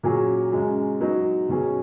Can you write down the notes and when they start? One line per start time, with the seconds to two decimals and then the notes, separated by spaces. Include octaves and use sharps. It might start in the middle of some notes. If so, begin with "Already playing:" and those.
0.03 A#2 F#3 C#4 G#4
0.52 F#2 C#3 G#3 C#4
1.01 F#3 B3 D#4
1.49 B2 F#3 C#4 G#4